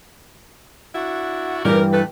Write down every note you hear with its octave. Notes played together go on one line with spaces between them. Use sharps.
D4 E4 F#4
G2 C#3 E3 G3 G4 A#4
A3 A4 B4